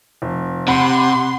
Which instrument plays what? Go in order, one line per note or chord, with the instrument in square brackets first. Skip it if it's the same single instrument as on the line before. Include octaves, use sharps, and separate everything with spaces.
[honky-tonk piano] F1
[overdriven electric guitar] C3 [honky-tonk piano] F#5 B5 [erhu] C6